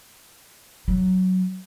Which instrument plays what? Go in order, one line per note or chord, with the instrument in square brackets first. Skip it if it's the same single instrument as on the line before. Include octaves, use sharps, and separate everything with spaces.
[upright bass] F#3